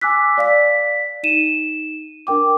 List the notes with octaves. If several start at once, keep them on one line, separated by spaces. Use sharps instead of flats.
G#5 D6 E6 F#6 B6
D5 F5 B6
D#4 D#7 E7
D4 A#4 G5 D6